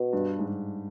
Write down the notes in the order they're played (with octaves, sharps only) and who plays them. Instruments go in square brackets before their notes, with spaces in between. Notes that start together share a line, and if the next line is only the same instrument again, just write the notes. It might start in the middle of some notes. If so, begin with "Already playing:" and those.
Already playing: [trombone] B2
[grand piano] G2
G#2
G2